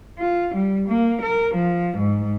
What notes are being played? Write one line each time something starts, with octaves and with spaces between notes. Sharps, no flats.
F4
G3
A#3
A#4
F3
G#2